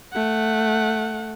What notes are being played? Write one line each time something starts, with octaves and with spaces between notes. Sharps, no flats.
A3 F#5